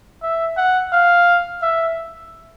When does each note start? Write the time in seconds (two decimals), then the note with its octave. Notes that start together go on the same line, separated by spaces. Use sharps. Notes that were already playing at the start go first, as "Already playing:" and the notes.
0.23 E5
0.57 F#5
0.93 F5
1.62 E5